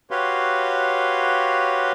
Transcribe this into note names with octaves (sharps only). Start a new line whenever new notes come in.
F#4 G4 B4 C#5 F5 C6